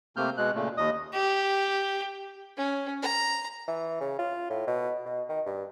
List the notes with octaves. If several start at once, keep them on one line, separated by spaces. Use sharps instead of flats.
C3 A3 A#3 C4 F6 G6
B2 G#3 F#6
A#2 C#3 A3
D#2 D#5 D#6
G4
C#4
A#5
E3
C#3
F4
A2
B2
B2
D#3
G2